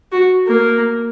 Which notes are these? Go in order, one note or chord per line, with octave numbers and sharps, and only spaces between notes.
F#4
A#3